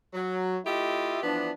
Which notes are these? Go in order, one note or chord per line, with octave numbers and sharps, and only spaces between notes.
F#3
A3 E4 F4 G4 D#5 E5
E3 F3 B3 D4